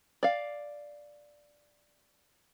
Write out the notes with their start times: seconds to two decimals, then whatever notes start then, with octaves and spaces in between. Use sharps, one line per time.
0.23 D5 F5